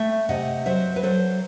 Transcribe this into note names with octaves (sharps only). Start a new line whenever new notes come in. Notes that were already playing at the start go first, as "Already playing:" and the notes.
Already playing: A3 E5 G5
C3 D#5 F#5
F#3 C5 E5
B4
F#3 A4 C5